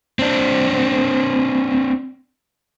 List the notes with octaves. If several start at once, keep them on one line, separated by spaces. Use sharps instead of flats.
C4 D4